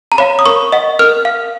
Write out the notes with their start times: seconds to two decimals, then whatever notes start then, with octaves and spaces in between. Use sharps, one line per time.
0.12 A#5
0.18 C#5 F5 B5
0.39 D#6
0.46 A#4 C#6
0.72 D#5 F#5
0.99 A#4 F6
1.25 F5